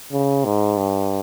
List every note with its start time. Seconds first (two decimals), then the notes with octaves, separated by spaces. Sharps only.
0.12 C#3
0.45 G#2
0.77 G2